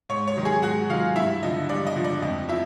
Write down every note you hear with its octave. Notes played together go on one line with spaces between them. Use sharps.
G#2 C#5 C#6
C#5 C#6
D#3 F#3
G#4 G#5
G#2 F#4 F#5
D#3 F#3 F4 F5
G2 E4 E5
D3 F3 D#5
G2 D5
D#5
D3 F3
D5
F2 D#5
F3 E4 E5